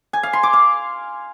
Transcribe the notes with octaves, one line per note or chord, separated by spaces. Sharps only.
G#5
F5
C6
D6
F5